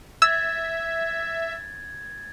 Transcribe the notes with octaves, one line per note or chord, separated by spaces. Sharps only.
E5 E6 G#6 A6